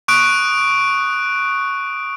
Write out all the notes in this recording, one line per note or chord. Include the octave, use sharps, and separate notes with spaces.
C#6 D#6 F#6 D7